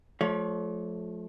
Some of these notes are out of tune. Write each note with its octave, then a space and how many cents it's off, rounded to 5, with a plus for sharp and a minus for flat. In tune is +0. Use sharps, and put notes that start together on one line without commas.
F3 +25 A3 -25 C#5 +25